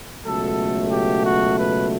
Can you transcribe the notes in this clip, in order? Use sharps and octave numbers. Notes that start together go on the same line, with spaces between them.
C#2 B2 F#3 A3 A4
G4
F#4
B4